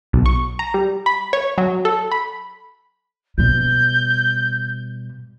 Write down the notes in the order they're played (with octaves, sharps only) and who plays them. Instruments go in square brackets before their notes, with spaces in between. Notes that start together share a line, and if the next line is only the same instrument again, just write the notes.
[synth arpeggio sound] B1
C#6
A#5
G3
B5
C#5
F#3
A4
B5
[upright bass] B2 G3 [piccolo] G6